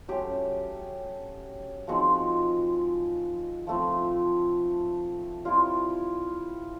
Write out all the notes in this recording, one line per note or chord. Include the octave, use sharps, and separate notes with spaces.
F#3 A3 C#4 G4
F3 G#3 C4 D#4 F#4
F3 A3 C4
G3 C4 E4 F4